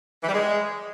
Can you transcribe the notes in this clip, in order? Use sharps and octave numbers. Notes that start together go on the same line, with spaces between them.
E3
G3
G#3